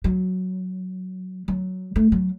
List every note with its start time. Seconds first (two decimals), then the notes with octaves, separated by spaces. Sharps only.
0.04 F#3
1.48 F#3
1.96 A3
2.12 F#3